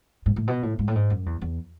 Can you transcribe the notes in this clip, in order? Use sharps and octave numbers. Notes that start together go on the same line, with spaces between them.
G#2
A2
B2
A2
G#2
A2
G#2
F#2
E2
E2